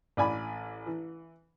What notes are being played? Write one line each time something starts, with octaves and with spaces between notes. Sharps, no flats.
A1 D5 G#5 B5
E3